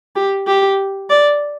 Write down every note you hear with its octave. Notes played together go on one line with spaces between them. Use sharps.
G4
G4
D5